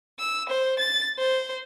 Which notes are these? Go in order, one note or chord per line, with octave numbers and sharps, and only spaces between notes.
E6
C5
A6
C5